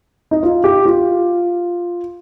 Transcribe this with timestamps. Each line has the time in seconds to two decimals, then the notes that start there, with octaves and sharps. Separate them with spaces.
0.31 D#4
0.43 F4
0.64 G4
0.86 F4